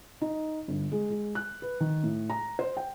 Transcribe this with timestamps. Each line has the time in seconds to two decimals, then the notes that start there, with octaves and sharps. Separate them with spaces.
0.22 D#4
0.68 G1
0.92 G#3
1.10 G#3
1.35 F#6
1.62 B4
1.80 D#3
2.04 A2
2.30 A#5
2.59 C5
2.77 G5